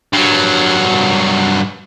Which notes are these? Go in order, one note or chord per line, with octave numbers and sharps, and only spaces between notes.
G2 F#3